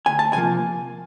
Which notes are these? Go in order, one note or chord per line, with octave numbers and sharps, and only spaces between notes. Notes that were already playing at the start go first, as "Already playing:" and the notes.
D2 G#5
A5
C3 F3 A#3 G#5